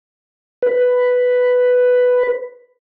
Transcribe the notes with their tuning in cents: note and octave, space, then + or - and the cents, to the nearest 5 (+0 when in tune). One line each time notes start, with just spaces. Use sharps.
B4 +5